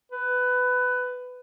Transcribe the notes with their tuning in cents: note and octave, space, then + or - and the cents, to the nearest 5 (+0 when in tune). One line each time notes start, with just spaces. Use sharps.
B4 +15